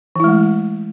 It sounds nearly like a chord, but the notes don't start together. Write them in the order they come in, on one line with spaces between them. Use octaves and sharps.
E3 E4 G#3 A3